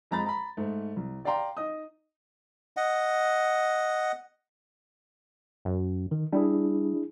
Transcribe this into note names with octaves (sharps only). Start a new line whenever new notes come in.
F2 G#3 A#5 B5 A6
A#5 B5
G#2 A3
C2
G4 D5 F5 G5 A#5 C6
D#4 D#5 D#6
D#5 F#5
F#2
D#3
G3 D4 E4 G#4